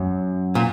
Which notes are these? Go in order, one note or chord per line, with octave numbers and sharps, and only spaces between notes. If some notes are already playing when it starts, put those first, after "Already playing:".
Already playing: F#2
A#2